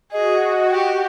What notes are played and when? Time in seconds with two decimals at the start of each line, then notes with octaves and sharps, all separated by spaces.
0.12 F#4 G#4 D#5
0.71 G4 G5